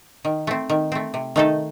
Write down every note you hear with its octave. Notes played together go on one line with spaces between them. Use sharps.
D#3
A3 C4
D#3
A3 C4
C3
D#3 A3 D#4 A4